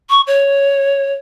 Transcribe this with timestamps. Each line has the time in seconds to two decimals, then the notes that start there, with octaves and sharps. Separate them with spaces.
0.10 C#6
0.27 C#5